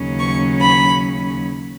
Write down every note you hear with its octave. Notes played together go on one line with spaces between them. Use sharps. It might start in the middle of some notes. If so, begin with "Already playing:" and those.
Already playing: D#2 C#3 F#3 C#4
C#6
B5